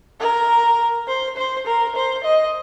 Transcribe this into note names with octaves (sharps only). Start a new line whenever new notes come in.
A#4
C5
C5
A#4
C5
D#5